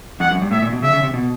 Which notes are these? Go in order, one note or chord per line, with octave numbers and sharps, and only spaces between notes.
F2 F#5
F#2
G2
A2 E5
A#2
B2
C#3 E5
C#3
C3
B2